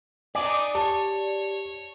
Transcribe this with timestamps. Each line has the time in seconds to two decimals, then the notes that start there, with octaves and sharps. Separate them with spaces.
0.35 D4 D#4 D5 G#5
0.75 G4 C#5 A5